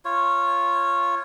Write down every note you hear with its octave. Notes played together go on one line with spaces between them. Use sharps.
F4 C#5